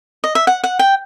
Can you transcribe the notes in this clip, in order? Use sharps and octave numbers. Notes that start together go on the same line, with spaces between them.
D#5
E5
F#5
F#5
G5